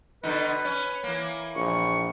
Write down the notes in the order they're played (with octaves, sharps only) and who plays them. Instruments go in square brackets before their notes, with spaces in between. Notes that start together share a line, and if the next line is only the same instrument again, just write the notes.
[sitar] B2 D3 D#4 [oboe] B4
[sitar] C#4
E3 A#3
[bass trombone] A#1 [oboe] C#6